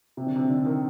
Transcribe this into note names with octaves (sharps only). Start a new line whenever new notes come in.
C3
D3
C3
D3
D#3